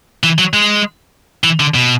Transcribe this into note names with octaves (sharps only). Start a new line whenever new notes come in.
E3
F#3
G#3
E3
D3
B2